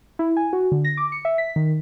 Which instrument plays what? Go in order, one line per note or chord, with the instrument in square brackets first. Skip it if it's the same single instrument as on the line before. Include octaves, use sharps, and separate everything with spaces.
[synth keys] E4
G#5
F#4
D3
A#6
D6
C#7
E5
B6
D#3